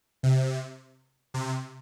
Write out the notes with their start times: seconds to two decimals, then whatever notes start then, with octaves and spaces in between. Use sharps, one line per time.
0.23 C3
1.34 C3